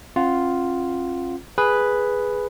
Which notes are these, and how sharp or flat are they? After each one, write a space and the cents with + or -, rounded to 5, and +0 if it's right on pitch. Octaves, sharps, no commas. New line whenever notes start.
C#4 -45 F4 +0 F#5 +20
G#4 +0 B4 +0